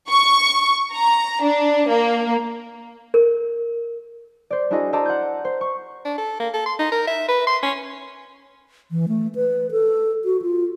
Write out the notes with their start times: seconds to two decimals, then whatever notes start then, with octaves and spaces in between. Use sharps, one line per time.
0.10 C#6
0.94 A#5
1.43 D4
1.89 A#3
3.14 A#4
4.50 C5 D5
4.70 D4 E4 F#4 G#4 A4 D#5
4.93 A4 C5 D5 D#5 A5 A#5
5.06 F#5 C6 G6
5.45 C5
5.61 C#6
6.05 D4
6.18 A4
6.40 A#3
6.54 A4
6.66 C6
6.79 D#4
6.92 A#4
7.07 E5
7.29 B4
7.47 C6
7.63 C#4
8.91 E3
9.08 A3
9.35 B4
9.71 A4
10.25 F#4
10.42 F4